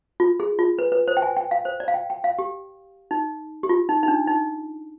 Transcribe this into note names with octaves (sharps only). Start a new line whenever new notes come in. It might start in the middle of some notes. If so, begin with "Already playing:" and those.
F4
G#4
F4
B4
B4
C5
G5
G#5
G5
F5
C5
D5
F5
G5
G5
F5
G4
D#4
G4
F4
D#4
D#4
D4
D#4